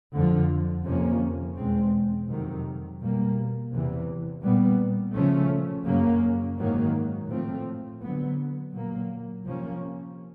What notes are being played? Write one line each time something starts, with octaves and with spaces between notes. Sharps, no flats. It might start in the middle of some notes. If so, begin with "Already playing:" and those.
F2 D3 F3
F2 C3 F3 A#3 C#4
E2 B2 G#3 C4
F2 C3 D#3 F#3
B2 G3 A#3
E2 C3 E3
A#2 G3 B3
C#3 F3 A3 C#4
F#2 C#3 F#3 A#3 C#4
G#2 D#3 F#3 A#3
A2 F3 A3 C4
D3 F#3 B3
A#2 F#3 A#3
C3 F3 A#3 C#4